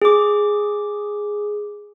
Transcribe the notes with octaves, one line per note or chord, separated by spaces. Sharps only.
G#4 D6